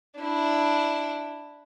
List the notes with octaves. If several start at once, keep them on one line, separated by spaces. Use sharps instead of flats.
D4 E4